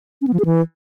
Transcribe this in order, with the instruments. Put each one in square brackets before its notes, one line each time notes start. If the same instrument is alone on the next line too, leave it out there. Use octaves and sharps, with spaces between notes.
[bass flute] C#4
B3
F3
G#4
E3